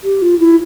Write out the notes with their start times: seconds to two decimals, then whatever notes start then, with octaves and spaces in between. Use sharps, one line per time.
0.04 G4
0.22 F4
0.39 E4